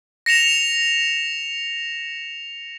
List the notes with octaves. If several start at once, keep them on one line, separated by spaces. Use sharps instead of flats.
A#6 C#7 E7 F7